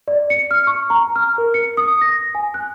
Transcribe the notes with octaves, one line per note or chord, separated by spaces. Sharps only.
D5
C#7
F6
C#6
A#5
F6
A#4
C#7
D#6
A#6
G#5
F#6